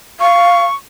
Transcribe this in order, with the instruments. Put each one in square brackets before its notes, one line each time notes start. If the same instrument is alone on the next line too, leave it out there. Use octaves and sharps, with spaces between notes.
[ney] F5 [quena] C#6